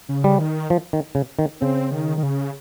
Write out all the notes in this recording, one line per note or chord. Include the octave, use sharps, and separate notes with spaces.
C#3
G3
D#3
F3
D#3
C#3
D#3
C#3 C4
D#3
D#3
C#3